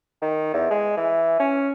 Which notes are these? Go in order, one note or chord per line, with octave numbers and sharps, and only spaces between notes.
D#3
E2
G#3
E3
C#4